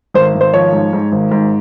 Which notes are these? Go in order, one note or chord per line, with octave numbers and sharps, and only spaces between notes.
G#1 C5
G#1
C5
F3 C#5
G#2
G#2
G#1
G#2